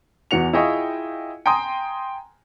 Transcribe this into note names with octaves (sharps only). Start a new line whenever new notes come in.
E2 E3 F#4 C#7 F7
E4 F4 G#4 D#5 G5 C#6
G5 G#5 A#5 C6 D#6